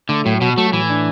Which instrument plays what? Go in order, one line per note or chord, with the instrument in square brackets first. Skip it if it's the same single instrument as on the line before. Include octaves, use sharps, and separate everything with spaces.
[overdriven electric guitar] D3 [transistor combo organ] A3
[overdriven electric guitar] A2 [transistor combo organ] F#3
[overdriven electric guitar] B2 [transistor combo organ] F#4
[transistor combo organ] F#3 [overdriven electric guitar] A3
[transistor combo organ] A2 [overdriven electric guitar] E3
[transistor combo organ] D4